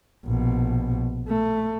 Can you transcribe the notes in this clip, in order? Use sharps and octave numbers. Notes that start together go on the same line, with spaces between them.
A#1 B2
A3